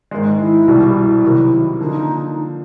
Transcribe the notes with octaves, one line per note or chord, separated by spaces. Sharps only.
G#2 D#3 G#3
E4
C2 B2 G3
E4
C3 D#3 F#3
D3 F3 A#3 D#4